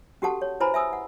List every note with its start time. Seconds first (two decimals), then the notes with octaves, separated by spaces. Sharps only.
0.22 C#4 F#4 G4 A4 F#5 A5
0.42 C#5
0.60 E4 B4 C5 G#5 A#5 B5
0.74 E5 G#5 D#6 E6
0.93 F#5